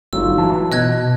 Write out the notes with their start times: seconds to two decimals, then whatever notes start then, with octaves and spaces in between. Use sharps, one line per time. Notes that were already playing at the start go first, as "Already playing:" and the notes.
0.13 G1 F#3 D#4 F4 E6
0.38 E3 A5
0.72 B2 D#5 F#6 G#6